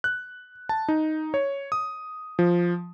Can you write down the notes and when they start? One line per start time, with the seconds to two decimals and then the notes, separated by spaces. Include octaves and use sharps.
0.04 F#6
0.69 A5
0.88 D#4
1.34 C#5
1.72 D#6
2.39 F3